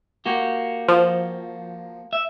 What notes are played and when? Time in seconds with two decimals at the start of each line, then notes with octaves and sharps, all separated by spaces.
0.25 A#3 F#4 G4
0.88 F3
2.13 E5